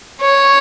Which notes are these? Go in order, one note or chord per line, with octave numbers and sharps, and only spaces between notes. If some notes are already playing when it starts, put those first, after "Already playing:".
C#5